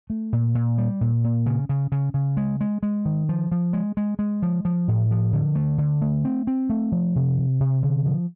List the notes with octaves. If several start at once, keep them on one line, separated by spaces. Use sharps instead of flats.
A3
A#2
A#2
G3
A#2
A#2
C#3
C#3
C#3
C#3
G#3
G#3
G#3
D#3
F3
F3
G#3
G#3
G#3
F3
F3
A2
F3
D3
A3
D3
A3
C4
C4
A3
F3
C3
C3
C3
D3
F3